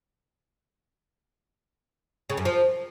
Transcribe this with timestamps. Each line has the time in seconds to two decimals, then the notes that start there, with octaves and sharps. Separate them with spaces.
2.30 C#3
2.37 F#2
2.45 F3